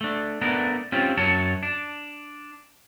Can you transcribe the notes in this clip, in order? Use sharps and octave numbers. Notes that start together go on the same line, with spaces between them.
A3 D4
A3 B3 D4 A#4
C4 C#4 F4 G4
F#2 F#3 C#5 A5
D4